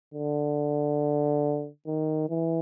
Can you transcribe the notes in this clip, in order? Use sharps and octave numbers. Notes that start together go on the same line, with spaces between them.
D3
D#3
E3